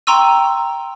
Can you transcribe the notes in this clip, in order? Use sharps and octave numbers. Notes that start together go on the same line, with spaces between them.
G5 A#5 C6 C#6 E6 D#7